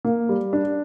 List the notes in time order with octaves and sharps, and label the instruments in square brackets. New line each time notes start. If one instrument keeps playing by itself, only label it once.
[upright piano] A#3
G3
D4